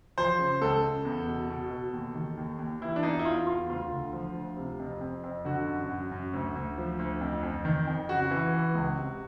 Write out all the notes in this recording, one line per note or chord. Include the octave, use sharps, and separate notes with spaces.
F3 C5
C#3
C#2 A4
C#3
E2
B2
B2
B2
D#2
D#3
D#2
D#2
E3 E4
D4
E2 D#4
E4
E2 F4
E2 F4
D2 F4
D3
F3
D2
C3
F2
F2
F2
D3 F#4
F#2
F#2
F#2
D2
D2
F3
D2
F2
F2
D#3
F2
C#3 F#4
E3
E3
C#2
C3